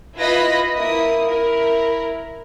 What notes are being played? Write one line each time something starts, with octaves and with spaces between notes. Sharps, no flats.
E4 F4 B4 D#5 B5 A#6
A#3 E4 D#6
E4 A#4